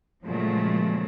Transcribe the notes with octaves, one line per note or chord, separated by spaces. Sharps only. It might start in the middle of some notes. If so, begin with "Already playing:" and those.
A#2 C#3 F3 F#3 G#3 A3